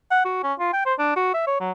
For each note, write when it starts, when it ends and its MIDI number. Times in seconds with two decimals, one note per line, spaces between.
0.11 0.20 78
0.25 0.41 66
0.43 0.53 61
0.59 0.71 65
0.73 0.84 79
0.86 0.94 72
0.99 1.11 62
1.16 1.33 66
1.34 1.46 76
1.47 1.58 73
1.60 1.71 54